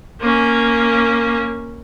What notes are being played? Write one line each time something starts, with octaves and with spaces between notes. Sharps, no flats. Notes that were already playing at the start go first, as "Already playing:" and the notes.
A#3 C#4